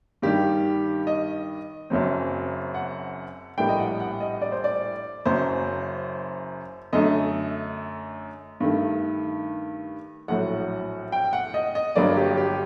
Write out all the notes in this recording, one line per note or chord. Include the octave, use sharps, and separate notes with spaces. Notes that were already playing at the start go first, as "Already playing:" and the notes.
G2 D#3 G3 G4
D#5
F#1 F#2 F#3 C4
F#5
A#1 A2 G3 A#3 G5
D#5
F#5
F#5
D#5
D5
C5
D5
F#1 F#2 F#3 C5
F#2 D3 A3 D#5
G2 D#3 A3
A#1 A2 F#3 F#5
G5
F#5
D#5
D#5
G1 G2 F#3 A#3 D5
G4
G4